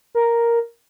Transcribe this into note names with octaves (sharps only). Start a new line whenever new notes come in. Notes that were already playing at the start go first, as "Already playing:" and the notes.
A#4